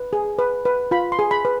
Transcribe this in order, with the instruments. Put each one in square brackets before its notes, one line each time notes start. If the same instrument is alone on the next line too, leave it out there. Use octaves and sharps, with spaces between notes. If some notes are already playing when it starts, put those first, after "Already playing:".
Already playing: [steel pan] B4
G#4
B4
B4
F4 B5
C6
G#4
B5
B4